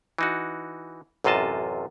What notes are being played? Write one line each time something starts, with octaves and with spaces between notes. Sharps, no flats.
E3 D#4 F#4
A1 F#2 C3 F4 D#5 A5